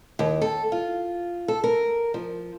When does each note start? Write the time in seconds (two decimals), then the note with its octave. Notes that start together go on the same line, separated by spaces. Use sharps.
0.19 D#2
0.41 A4
0.72 F4
1.48 A4
1.64 A#4
2.14 F3